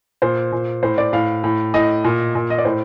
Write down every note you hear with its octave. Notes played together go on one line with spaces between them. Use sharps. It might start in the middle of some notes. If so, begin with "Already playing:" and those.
A#2 C5
A#2
A2 C5
D5
A2 F5
A2
A2 D#5
A#2
A#2
D#5
D5
A2 C5